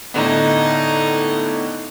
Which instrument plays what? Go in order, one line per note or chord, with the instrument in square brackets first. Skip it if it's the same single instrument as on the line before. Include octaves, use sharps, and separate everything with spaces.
[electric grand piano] A2 D3 B3 [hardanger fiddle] D#4